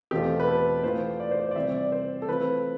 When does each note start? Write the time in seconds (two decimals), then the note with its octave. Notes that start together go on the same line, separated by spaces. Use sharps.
0.11 E2 B2 A3 C4 F4 G4
0.40 B4
0.48 A4
0.83 A2 E3 B3 F4 C5
1.20 D5
1.31 C5
1.38 D5
1.51 D5
1.56 C3 E3 G3 C4 E5
1.74 D5
1.92 C5
2.22 A4
2.28 E3 A3 C4 F4 B4